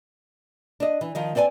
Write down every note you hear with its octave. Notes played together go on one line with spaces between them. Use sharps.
D4 D#5
E3
D#3 F3 D#5
C4 B4 D5 F#5 G#5